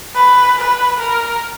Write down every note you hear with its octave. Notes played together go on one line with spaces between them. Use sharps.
B4
B4
A#4